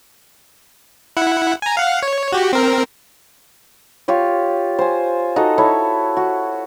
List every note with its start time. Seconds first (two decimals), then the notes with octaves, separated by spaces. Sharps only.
1.17 E4 F#5
1.62 G#5 A#5
1.77 F5 F#5
2.03 C#5
2.32 F#4 G4
2.53 C4 A#4
4.08 F4 G4 C#5
4.79 C5 G#5
5.36 D#4 F#4 A4 D#5
5.58 E4 A4 C#5
6.17 F#4